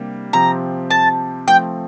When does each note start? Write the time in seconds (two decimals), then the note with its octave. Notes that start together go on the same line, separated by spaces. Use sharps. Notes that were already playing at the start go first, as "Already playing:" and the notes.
Already playing: C3 G3 A#3 D4 G4
0.33 C3 F3 C4 G4 A#5
0.90 A5
1.48 F3 A3 C4 G5